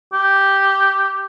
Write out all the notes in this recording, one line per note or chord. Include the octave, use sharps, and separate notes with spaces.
G4